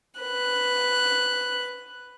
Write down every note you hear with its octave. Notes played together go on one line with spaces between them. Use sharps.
B4 F#6